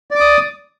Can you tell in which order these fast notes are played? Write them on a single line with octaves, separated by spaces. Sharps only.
D5 D6 D#6